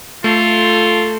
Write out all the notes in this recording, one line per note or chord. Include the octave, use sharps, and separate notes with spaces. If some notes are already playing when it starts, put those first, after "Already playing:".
A3 F4 A4 C6